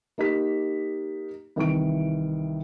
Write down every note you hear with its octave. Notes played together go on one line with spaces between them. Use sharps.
A#3 D#4 G4 B6
C2 D#3 E3 C#6 D7